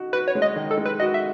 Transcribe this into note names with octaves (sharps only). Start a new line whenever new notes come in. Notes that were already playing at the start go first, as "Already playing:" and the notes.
Already playing: D#4 F#4
F#4 B4
C#5
G#3
D#5
D#3
A4
G#3
B4
F#4 D#5
E5